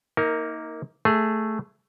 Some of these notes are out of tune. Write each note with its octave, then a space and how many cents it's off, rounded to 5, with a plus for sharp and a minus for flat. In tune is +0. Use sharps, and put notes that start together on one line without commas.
A#3 +0 D#4 +30 A#4 -5
A3 +0 G#4 -5